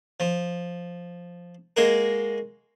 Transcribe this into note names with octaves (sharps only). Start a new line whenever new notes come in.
F3
G#3 A#3 F#4 A#4